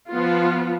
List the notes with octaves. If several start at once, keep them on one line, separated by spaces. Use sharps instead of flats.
F3 B3 F4